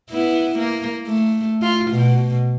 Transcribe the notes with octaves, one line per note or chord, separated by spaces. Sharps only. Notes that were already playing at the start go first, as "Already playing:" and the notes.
B3 E4
A#3
A3
F4
B2